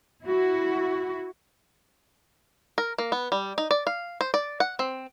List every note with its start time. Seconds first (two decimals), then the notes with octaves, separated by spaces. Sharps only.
0.23 E4 F#4
2.78 A#4
2.98 A#3
3.12 B3
3.32 G3
3.58 D#4
3.71 D5
3.87 F5
4.21 C5
4.34 D5
4.60 F#5
4.79 C4